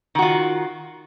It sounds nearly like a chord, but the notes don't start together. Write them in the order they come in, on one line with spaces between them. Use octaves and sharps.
D#3 F#4 F4